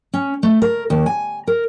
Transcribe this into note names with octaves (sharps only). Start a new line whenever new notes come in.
C#4
A3
A#4
D#2
G#5
A#4